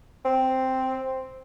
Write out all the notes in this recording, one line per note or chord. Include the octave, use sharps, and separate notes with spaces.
C4